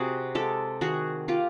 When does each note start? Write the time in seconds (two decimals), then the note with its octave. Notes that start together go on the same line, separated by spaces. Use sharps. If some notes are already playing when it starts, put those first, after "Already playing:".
Already playing: C3 F#4 G#4
0.35 G#3 G4 A4
0.81 D#3 F#4 G#4
1.28 A#3 F4 G4